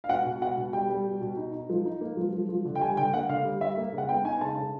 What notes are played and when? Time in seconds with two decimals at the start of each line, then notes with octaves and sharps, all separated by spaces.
0.04 F5
0.09 B2 F#5
0.26 B2
0.41 B2 F#5
0.57 B2
0.73 G3 G5
0.89 G3
1.06 B2
1.21 B2
1.37 D#4
1.53 D#4
1.70 F3
1.85 D#4
2.01 A#3
2.17 F3
2.33 F3
2.49 F3
2.65 D3
2.75 G5
2.81 G3 G#5
2.97 D3 G5
3.13 A#3 F#5
3.29 D3 F5
3.45 G3
3.61 G3 E5
3.77 A#3
3.93 C#3
3.98 F#5
4.09 B3 G5
4.25 D#4 G#5
4.41 C#3 A5
4.57 C#3